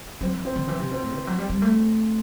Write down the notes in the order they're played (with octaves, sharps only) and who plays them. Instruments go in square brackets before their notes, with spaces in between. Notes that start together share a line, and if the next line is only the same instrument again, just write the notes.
[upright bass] F#3 [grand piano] C4
[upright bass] E3
[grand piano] C4
[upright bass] D#3
[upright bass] E3 [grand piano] C4
[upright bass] C3
[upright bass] B2 [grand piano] C4
[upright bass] A2
E3
F#3
G3
G3
A3